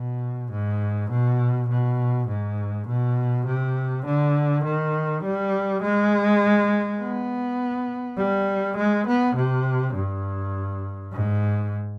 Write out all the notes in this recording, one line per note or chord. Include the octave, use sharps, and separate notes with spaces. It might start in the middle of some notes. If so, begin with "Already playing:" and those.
Already playing: B2
G#2
B2
B2
G#2
B2
C3
D3
D#3
G3
G#3
B3
G3
G#3
B3
C3
G2
G#2